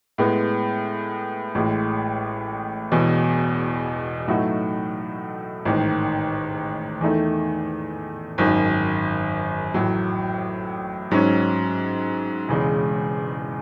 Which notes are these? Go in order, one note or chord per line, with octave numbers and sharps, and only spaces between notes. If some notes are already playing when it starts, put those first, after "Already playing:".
A2 G#3 B3
A1 A2 G#3
E1 E2 B2
A2 F#3 A3 D#4 F#4
A1 G#2 D#3
E2 D#3 A3 D#4 A4
G#1 F#2 D#3
A1 A2 F#3
G#2 F#3 C#4
E1 E2 C#3 G#3